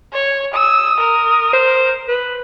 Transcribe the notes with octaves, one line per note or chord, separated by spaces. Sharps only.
C#5
D#6 E6
A#4
C5
B4